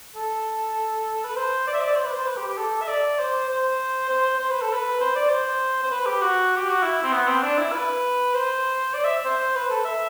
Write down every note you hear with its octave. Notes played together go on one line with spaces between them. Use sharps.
A4
B4
C5
D5
E5
D5
C5
B4
C5
B4
G4
G4
A4
E5
D5
C5
C5
C5
C5
B4
A4
B4
C5
D5
C5
C5
B4
G4
F#4
G4
F#4
E4
C4
B3
C4
D4
E4
B4
C5
D5
E5
C5
B4
A4
E5